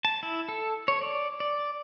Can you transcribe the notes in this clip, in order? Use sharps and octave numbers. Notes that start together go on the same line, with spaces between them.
A5
E4
A4
C#5
D5
D5